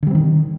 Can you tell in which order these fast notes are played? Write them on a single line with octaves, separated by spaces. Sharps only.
D3 G3 C4 D#3